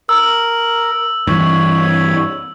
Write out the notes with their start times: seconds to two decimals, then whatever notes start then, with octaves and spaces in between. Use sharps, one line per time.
0.09 A#4 E6
1.27 G2 E3 C#5 B5